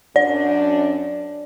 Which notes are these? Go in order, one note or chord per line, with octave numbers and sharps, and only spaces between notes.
F#2 D4 D5